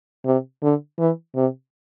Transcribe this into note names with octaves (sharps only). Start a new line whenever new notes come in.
C3
D3
E3
C3